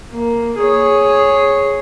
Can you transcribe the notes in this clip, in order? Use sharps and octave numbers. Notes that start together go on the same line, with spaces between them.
A#3
G#4 C#5